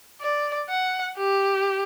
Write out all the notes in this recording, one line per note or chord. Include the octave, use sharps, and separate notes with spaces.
D5
F#5
G4